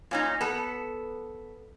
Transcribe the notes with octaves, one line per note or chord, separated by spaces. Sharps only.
A#2 C#4 D#4
B3 A4